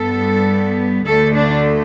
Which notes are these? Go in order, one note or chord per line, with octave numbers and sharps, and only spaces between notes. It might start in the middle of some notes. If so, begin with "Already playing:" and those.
Already playing: G2 G3 B3 A4
D2 D3 A3 A4
D4